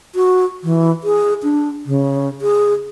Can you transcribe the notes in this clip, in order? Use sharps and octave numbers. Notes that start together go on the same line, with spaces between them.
F#4
E3
G#4
D4
C#3
G#4